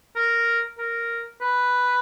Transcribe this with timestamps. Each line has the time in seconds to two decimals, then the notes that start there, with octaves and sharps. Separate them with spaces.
0.16 A#4
0.78 A#4
1.41 B4